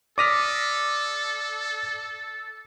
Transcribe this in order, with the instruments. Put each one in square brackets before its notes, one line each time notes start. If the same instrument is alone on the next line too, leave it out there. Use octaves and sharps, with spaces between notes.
[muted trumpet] A4 [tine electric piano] D5 D#6 F6 [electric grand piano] D6 A#6 B6